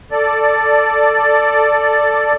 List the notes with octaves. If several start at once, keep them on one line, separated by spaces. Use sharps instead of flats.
A4 D5